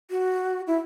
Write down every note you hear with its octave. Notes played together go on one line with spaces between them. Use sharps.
F#4
E4